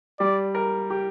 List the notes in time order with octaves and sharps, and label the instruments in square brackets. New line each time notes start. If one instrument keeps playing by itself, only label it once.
[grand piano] G3 [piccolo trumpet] D5
[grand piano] A#4
G4